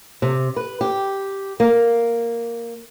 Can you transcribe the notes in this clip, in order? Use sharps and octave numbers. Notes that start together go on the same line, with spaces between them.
C3
B4
G4
A#3